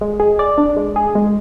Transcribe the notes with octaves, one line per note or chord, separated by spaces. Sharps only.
G#3
G#4
D5
D4
G#3
G#4
G#3